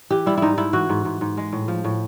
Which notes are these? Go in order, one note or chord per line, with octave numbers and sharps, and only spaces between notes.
E3 G4
G3 E4
G#2 D#4 E4
G#2 E4
E3 F#4
G#2
G#2
G#2
G#3
A2
F3
A2